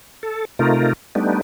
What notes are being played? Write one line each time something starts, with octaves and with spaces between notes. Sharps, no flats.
A4
C3 A3 D#4 F4 A#4
G3 A3 B3 D4 D#4